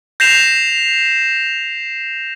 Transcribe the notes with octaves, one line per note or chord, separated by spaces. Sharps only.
G6 A#6 C7 E7 F7